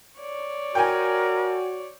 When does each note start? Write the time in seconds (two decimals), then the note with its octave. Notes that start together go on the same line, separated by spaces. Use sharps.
0.20 C#5 D5
0.75 F#4 A#4 G5 G#5